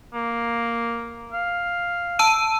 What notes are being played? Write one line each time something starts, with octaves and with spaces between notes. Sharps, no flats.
A#3
F5
A5 E6 D#7